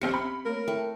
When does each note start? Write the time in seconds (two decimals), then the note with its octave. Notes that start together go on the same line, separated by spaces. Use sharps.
0.02 A#1 C4 C#4 G4 F5 C#7
0.14 C4 B5
0.46 A3 A#3 A#4 C#5
0.68 A3 E4 G5 A5